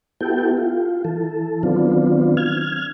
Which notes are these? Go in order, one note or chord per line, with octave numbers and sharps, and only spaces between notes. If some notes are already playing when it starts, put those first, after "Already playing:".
B3 E4 F#4 G4 A4 G5
F4
E3 A4
D#3 F#3 B3 C4 D4 F4
F6 G#6